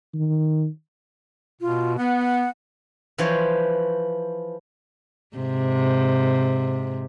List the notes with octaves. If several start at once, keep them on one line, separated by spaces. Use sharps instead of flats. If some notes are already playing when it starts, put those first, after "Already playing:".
D#3
B2 F4
B3 F#5
E3 F3 C5 C#5
G#2 C3